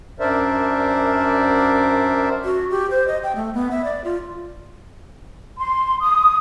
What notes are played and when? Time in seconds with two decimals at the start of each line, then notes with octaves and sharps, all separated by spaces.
0.20 F#2 D4 A#4 C5 D5 E5
2.45 F#4
2.70 G4
2.91 C5
3.08 D#5
3.23 G5
3.36 A3
3.54 B3
3.71 E5
3.85 D5
4.04 F4
5.58 C6
6.01 D#6